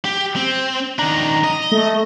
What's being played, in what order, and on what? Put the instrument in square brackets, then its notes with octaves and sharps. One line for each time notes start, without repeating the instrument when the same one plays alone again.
[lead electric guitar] G4
C4
[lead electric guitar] D#3 D4 [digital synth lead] A#5
[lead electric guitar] D#5
[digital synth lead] A3